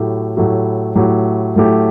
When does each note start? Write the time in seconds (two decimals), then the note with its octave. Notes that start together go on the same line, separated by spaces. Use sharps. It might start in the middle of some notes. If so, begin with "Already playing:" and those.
Already playing: A2 F#3 A3 E4 G4
0.36 A2 F#3 A3 E4 G4
0.95 A2 F#3 A3 E4 G4
1.56 A2 F#3 A3 E4 G4